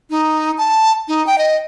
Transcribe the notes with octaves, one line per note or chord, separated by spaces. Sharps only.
D#4
A5
D#4
G5
D#5